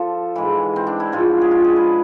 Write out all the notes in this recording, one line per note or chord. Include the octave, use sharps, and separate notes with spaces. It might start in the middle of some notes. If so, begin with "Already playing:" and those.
Already playing: F3 F4 A4
G#2 E3 E4
C4
D4
E4
G#2 F3 F4
G#4
F4
G#4
B4